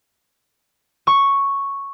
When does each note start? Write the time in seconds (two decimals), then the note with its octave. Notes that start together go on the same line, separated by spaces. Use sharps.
1.07 C#6